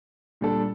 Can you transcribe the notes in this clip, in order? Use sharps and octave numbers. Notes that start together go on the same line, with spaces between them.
A#2 G3 D4 A4